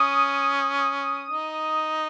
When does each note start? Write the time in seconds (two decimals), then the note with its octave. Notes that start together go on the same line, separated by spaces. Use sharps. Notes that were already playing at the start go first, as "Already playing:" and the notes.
Already playing: C#4 D#6
1.30 D#4